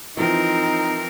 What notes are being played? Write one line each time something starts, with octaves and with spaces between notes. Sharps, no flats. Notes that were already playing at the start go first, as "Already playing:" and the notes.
E3 F3 C4 D#4 A#4